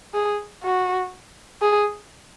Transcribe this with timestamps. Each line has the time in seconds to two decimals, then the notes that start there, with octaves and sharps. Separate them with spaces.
0.14 G#4
0.63 F#4
1.62 G#4